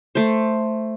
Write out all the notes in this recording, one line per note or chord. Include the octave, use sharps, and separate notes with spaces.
A3 C5